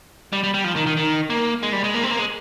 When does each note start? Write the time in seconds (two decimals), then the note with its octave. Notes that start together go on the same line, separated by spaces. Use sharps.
0.33 G3
0.43 G3
0.54 G3
0.64 F3
0.76 D#3
0.87 D#3
0.97 D#3
1.30 A#3
1.63 G#3
1.73 G3
1.84 G#3
1.94 A#3
2.03 C4
2.11 A#3
2.19 G#3